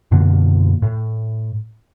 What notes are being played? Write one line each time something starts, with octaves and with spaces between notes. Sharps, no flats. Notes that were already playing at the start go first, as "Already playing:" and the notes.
F#2 B2 D3 A#3
A2